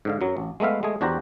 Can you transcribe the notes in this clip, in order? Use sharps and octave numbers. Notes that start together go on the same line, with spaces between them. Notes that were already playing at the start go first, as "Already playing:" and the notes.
G#2 D3 F5
F#2 F#3
A1
G#3 A3 B3 E5 F5
G#3 A3 G#4
E2 D4 F#4 G4 C5 A#5